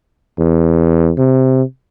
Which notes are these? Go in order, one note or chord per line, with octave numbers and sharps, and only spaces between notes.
E2
C3